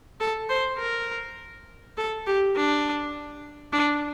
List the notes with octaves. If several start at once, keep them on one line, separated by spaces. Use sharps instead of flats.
A4
C5
A#4
A4
G4
D4
D4